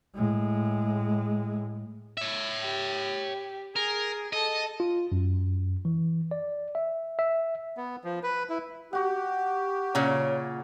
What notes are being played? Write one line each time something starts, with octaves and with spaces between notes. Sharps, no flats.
A2 G#3
C#5 E5
G4
G#4 A#4
A4 D#5
F4
F#2
E3
D5
E5
E5
B3
F3
B4
E4
F#4 G4 F#5
A#2 C#3 C#5 A#5